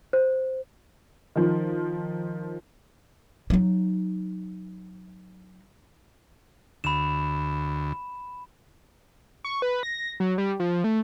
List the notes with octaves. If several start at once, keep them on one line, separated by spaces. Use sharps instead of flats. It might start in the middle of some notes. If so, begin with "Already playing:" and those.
C5
D#3 F3
F#3 D#4
D2 B5 E7
C#6
B4
A#6
F#3
G3
F3
A3